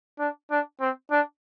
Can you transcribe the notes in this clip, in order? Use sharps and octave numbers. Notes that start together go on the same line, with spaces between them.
D4
D4
C4
D4